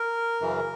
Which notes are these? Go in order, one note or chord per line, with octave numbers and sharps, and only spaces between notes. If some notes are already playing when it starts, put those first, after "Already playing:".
Already playing: A#4
F#2 C#3 E3